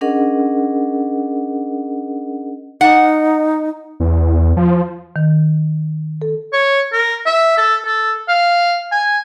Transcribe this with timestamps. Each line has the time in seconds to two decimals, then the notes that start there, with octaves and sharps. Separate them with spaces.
0.01 C#4 D4 G#4 A#4 D#5 F#5
2.81 D#4 F#5
4.00 E2
4.57 F3
5.16 D#3
6.22 A4
6.53 C#5
6.93 A#4
7.26 E5
7.58 A4
7.85 A4
8.29 F5
8.92 G#5